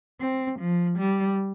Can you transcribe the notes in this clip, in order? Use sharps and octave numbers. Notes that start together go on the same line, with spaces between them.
C4
F3
G3